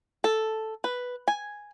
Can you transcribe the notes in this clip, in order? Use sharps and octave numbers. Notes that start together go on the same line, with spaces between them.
A4
B4
G#5